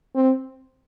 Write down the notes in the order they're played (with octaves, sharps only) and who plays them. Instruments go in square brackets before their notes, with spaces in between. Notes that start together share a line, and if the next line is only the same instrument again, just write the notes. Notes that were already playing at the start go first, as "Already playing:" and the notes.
[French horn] C4